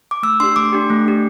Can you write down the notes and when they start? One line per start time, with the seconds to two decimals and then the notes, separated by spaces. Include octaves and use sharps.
0.11 D6
0.23 A3 E6
0.40 D4 G4 C6
0.56 A3 D6
0.73 D4 G4
0.90 A3
1.06 D4 G4